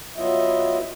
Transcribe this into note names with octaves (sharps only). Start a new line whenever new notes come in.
F#3 B3 E4 F4 D#5 E5